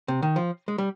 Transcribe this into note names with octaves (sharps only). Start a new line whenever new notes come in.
C3
D#3
F3
G#3
G3